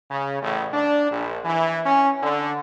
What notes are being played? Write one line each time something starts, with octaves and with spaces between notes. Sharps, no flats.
C#3
A1
D4
A#1
E3
C#4
D3